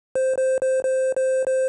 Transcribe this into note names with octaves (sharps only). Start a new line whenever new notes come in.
C5
C5
C5
C5
C5
C5